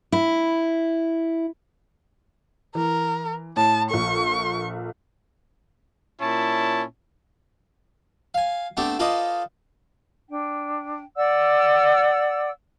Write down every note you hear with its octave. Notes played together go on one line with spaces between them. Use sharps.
E4
E3 A#4
A2 A5
A#1 A4 C#6
A#2 C#4 E4 A5
F5 G#5
A3 B3 C4 D4 G4 A4
F4 A4 B4 C5 D5 D#5
D4 G5
D5 F#5 E6